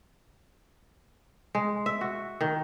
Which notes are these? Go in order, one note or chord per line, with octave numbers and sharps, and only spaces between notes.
G#3
E5
F#4
D#3